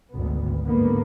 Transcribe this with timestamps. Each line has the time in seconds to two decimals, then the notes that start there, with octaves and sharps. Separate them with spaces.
0.13 G#1 D2 B3
0.66 G#2 D3 A#3 B3